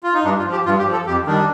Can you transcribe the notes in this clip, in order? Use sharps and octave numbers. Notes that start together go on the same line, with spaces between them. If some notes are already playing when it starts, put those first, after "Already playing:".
F4
D#4
G2 D4
F4
F3
G4
G2 F4
G4
F3
A4
F2 G4
D#3 G3 D4